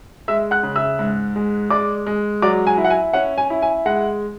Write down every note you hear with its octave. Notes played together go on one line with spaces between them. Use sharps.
G#3 E5 E6
F#5 F#6
C#3
E5 E6
G#2
G#3
G#3 D5 D6
G#3
F#3 D5 D6
G#5
E4
F#5
G#5
C#4 F#5
G#5
E4
G#5
G#3 F#5